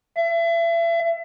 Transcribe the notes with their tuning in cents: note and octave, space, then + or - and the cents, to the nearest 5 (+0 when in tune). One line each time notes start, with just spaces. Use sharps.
E5 +35